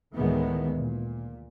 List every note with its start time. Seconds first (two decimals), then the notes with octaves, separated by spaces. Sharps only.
0.15 D2 A2 D#3 E3 G#3 B3
0.76 A#2